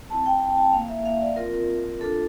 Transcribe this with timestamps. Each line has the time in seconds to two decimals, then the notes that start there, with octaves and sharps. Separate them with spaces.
0.09 A3 C4 E4 A5
0.26 G5
0.41 A5
0.58 A5
0.73 A#3 E4 F5
0.88 E5
1.06 F5
1.21 D5
1.36 A3 C4 F4 A#4
2.01 A3 D4 F4 A4